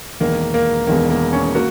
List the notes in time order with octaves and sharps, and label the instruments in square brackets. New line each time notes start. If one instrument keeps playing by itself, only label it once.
[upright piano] E1 E2 D#3 [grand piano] A#3
[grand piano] A#3
[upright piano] E1 E2 D#3 [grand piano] A#3
[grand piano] A#3
C#4
[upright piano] A#3 [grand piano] F#4